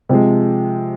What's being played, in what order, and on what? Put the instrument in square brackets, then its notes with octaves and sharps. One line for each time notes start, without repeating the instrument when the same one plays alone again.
[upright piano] C3 F3 G#3